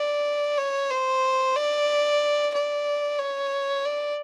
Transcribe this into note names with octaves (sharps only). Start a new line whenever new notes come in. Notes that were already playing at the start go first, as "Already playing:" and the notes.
Already playing: D5
C#5
C5
D5
D5
C#5
D5